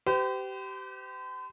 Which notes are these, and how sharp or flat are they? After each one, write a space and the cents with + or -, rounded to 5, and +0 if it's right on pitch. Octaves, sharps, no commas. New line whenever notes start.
G4 -25 C5 -45